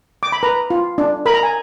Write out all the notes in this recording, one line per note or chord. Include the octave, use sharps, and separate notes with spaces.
D6
B5
B4 A#5
F4
D4
A#4 B5
A#5
G#5